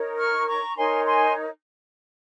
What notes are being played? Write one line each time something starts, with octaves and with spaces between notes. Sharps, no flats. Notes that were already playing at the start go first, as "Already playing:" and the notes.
Already playing: D#4 A#4 C#5
C#6 F6
A#5 C#6
D#4 A#4 C#5 G#5 C6
G#5 C6